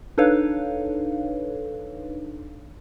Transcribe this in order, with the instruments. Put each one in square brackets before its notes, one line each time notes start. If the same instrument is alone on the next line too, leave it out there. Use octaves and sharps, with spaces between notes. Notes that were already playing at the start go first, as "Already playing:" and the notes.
[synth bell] D4 D#4 A4 B4 C#5 F5